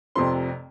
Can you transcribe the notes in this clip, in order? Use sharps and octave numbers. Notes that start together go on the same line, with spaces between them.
F1 F2 C3 F3 C4 C6